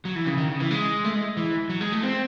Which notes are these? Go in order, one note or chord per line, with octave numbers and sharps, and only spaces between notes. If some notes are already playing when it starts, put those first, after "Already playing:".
F#3
E3
C#3
D#3
C#3
E3
G#3
A3
G#3
E3
F#3
G#3
A3
C4